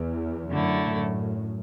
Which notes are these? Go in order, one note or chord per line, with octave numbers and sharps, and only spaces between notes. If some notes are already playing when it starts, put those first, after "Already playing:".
Already playing: E2
F#2 D3 A3 E4
F#2 A2